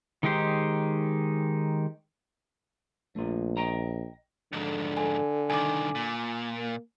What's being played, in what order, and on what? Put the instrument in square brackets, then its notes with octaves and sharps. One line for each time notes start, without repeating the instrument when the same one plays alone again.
[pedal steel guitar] D#3 G#3 D#4 G4 C5
[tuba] A#1 [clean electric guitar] A3 F4
[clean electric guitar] D#5 G5 A#5
[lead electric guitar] F2 G#2 [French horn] D3
[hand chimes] A4 G#5
[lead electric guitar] C2 D#3 [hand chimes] G#5 D6
[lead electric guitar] A#2
[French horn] A#3